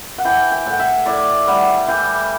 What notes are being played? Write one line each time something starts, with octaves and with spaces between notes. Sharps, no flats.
F#5
E3 G5
G5
A2 F#5
E5
A2 D5
G3 F#5
E3 G5